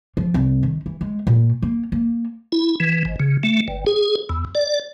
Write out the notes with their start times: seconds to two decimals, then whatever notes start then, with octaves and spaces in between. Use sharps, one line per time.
0.17 F3
0.34 C2
0.63 D#3
0.86 E3
1.01 G#3
1.27 A#2
1.62 A#3
1.92 A#3
2.52 E4
2.80 E3
3.05 G#1
3.20 C#3
3.43 A3
3.68 G1
3.87 G#4
4.29 E2
4.55 D5